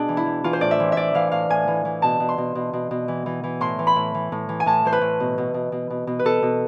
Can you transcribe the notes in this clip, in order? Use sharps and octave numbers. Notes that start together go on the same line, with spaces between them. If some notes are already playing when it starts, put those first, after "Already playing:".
Already playing: B2 D4 G#4
E3
E4
E3
E3 F4
C5
A2 D5
E5
E3
A2 D5 E5
E3 F5
A2 F5
A2 G#5
E3
E3
B2 A5
B2
C6
B2
B2
B2
B2
E3
E3
E3
A2 C6
E3
B5
A2
E3
A2
E3
G#5
A2 A5
E3 C5
B4
A2
B2
B2
B2
B2
B2
B2
B4
B2 A4
B2